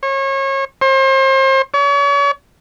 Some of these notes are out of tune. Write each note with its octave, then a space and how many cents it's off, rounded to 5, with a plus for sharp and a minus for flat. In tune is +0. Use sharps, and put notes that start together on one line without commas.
C#5 -30
C5 +35
C#5 +40